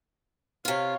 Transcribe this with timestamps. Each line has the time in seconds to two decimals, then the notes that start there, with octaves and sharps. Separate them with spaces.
0.65 C3 F4 C#5 F5